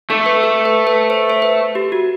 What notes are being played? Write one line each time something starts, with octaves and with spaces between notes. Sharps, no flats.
A3 A4
B4
A4
B4
B4
C5
C5
B4
G4
F#4